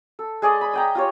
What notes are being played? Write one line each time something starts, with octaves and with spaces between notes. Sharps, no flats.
A4
G#3 G#4 D5 D#5
B5
D#5 G5 A#5
F4 G4 C#5